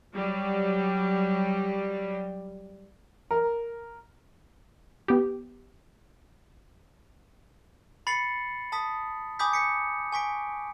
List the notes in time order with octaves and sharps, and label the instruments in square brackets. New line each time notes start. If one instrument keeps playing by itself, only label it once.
[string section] F#3 G3
[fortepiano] A#4
[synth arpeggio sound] B3 G4
[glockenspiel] B5 A6 C7 C#7 F#7
A5 D#6 B6
G#5 B5 D6 D#6 G6 B6
G6 B6 C#7
G#5 C#6 B6 D7